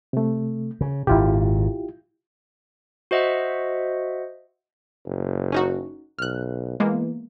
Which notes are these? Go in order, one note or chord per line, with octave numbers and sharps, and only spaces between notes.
C3 A3
C#3
G#1 A#2 E4 F4 G4
F#4 C5 D#5 E5 F#5
F#1
C#4 D#4 F#4
B1 F6 F#6
E3 G#3 A#3 B3